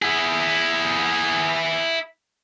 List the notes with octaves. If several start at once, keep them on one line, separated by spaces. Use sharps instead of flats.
E4 G#4